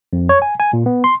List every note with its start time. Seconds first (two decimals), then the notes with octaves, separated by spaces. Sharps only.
0.13 F2
0.29 C#5
0.42 G#5
0.60 G#5
0.73 A#2
0.86 B3
1.04 C6